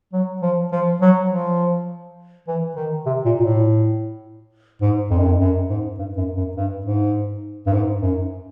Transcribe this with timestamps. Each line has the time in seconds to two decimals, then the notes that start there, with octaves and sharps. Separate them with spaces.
0.13 F#3
0.42 F3
0.72 F3
1.01 F#3
1.30 F3
2.48 E3
2.76 D#3
3.06 C3
3.25 A#2
3.40 A#2
3.44 A2
4.81 G#2
5.10 F2
5.18 F#2
5.26 F2
5.40 F#2
5.69 G#2
5.98 G2
6.17 F#2
6.37 F#2
6.57 G2
6.86 G#2
7.66 G2
7.73 G#2
8.02 F#2